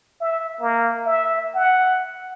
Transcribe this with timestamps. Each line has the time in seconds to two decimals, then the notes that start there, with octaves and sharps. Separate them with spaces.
0.21 E5
0.61 A#3
1.06 E5
1.55 F#5